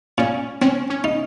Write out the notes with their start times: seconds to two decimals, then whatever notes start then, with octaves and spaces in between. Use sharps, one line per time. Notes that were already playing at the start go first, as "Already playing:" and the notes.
0.18 A#2 C#4
0.61 C4 C#4
0.90 C#4
1.04 D#4